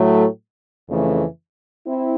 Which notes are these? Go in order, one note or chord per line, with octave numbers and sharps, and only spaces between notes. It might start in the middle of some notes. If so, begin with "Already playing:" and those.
Already playing: A2 F#3 A3
F2 C#3 E3 A3
C4 E4